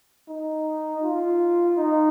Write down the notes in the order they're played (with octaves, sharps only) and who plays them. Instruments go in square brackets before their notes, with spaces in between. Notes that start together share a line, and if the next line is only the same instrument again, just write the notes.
[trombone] D#4
F4
D#4